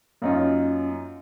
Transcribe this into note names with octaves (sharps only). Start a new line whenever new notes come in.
F#2 A#3 C#4 D#4 F4